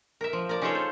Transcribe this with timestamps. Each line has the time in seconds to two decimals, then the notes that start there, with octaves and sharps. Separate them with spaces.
0.21 A#4 E5
0.33 F3
0.49 A#4 D5
0.61 C#4 D#4 F4 G#4 A4 C#5
0.75 C5